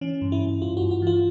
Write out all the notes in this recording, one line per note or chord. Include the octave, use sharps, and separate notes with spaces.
E3 C#4
G2
E4
G2
G2 F4
G2 F#4
F#4
E3 F4